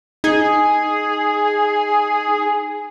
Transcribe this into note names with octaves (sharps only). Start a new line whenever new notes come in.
D#4 G#4